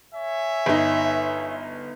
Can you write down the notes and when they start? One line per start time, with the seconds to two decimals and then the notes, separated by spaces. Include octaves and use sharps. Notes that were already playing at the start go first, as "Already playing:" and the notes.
0.15 C#5 E5 G#5
0.66 G1 D#4